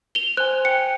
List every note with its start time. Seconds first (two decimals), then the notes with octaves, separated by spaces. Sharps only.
0.15 F7 G7
0.37 C5 G#5 F#6
0.51 G#5
0.65 G5 C#7